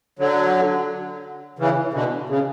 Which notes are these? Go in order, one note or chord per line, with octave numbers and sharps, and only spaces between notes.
D3 F#3
C#3 E3
B2 D3
C#3